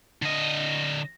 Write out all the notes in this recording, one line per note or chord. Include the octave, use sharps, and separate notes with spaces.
D3 D#5